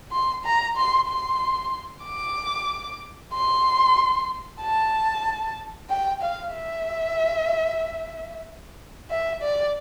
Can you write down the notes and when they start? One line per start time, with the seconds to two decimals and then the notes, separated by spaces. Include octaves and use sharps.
0.12 C6
0.45 A#5
0.77 C6
1.08 C6
2.05 D6
3.34 C6
4.61 A5
5.90 G5
6.22 F5
6.53 E5
9.11 E5
9.42 D5